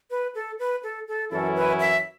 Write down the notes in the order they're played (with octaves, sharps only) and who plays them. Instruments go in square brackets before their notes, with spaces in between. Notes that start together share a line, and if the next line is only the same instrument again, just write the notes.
[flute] B4
A4
B4
A4
A4
[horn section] F#2 E3 C#4 E4 [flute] A4
[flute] B4
E5